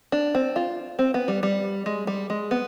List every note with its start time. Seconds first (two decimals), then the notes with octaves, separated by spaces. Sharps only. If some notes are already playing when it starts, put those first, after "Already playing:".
0.12 D4
0.35 C4
0.56 F4
0.99 C4
1.14 B3
1.28 G3
1.43 G3
1.86 G#3
2.07 G3
2.30 G#3
2.51 B3